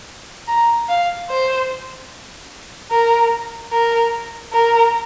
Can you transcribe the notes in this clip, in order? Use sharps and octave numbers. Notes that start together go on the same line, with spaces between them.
A#5
F5
C5
A#4
A#4
A#4